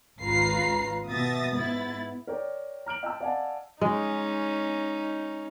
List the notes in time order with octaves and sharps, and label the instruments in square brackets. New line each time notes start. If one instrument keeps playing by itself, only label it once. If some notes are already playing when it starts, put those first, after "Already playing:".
[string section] G#1 C#2 F4 B4 A#5 C7
B2 E5 D#6 A6 A#6
G#2 B3 E4 A6
[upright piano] A#4 C#5 D5 G5
A#5 F6 D7 F#7
D#5 G5 A5 A#5 E6
D5 D#5 F5 F#5 G#5 A5
[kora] G#3 [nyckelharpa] C#4 D#4